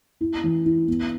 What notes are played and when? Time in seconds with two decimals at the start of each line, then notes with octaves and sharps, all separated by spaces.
0.21 E4
0.44 E3
0.66 E4
0.87 B3